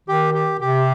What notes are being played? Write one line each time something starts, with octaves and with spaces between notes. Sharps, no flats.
D#3 G4
G4
C3 G4